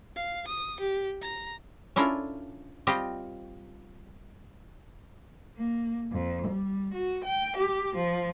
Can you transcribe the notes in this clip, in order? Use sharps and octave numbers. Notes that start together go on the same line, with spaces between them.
F5
D#6
G4
A#5
C#4 D4 E4 F4 A4 A#4
G3 C4 F4 G4 D#5
A#3
F2
G3
F#4
G5
G4
F3